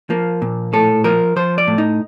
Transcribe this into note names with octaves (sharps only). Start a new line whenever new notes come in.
F3 A#3
A#2
A2 A4
F3 A#4
F3 C5
D5
A2
D#4